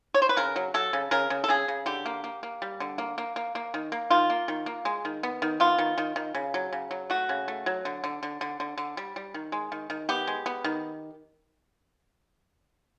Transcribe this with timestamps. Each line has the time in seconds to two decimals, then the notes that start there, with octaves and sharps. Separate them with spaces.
0.14 C#5
0.22 C5
0.29 B4
0.37 C#3 A#4
0.56 F#3
0.74 F#3 A4
0.93 C#3
1.11 C#3 A#4
1.30 C#3
1.44 A4
1.49 C#3 G#4
1.68 C#3
1.86 D3 G4
2.06 A#3
2.24 A#3
2.43 A#3
2.62 G3
2.80 D3
2.98 A#3
3.18 A#3
3.36 A#3
3.55 A#3
3.74 D#3
3.92 A#3
4.10 D#3 F4
4.30 A#3
4.48 D#3
4.66 A#3
4.85 G#3
5.05 D#3
5.23 B3
5.42 D#3
5.60 B3 F4
5.79 D#3
5.98 D#3
6.16 D#3
6.35 C#3
6.54 F#3
6.73 C#3
6.91 F#3
7.10 A3 F#4
7.29 C#3
7.48 A3
7.66 F#3
7.85 D3
8.04 D3
8.23 D3
8.41 D3
8.60 D3
8.78 D3
8.97 G3
9.16 G3
9.34 D#3
9.52 G#3
9.72 D#3
9.90 D#3
10.09 B3 G4
10.27 G#3
10.46 B3
10.64 D#3